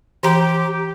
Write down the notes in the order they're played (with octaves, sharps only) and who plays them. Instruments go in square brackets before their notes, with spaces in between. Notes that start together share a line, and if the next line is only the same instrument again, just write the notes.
[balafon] E3 A#5 [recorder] G4